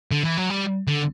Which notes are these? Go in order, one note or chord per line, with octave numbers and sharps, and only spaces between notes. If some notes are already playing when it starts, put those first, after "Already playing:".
D3
E3
F#3
G3
D3